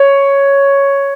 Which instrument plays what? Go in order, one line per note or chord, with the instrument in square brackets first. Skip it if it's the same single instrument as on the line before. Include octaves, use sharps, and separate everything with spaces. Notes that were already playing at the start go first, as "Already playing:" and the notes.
Already playing: [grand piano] C#5